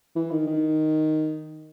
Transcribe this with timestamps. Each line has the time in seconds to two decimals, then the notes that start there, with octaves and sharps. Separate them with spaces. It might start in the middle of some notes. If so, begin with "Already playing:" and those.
0.15 E3
0.31 D#3
0.47 D#3